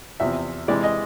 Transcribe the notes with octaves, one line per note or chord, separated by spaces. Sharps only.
E2 C3 F3 E5
C3 E3 G#3 D5
D#5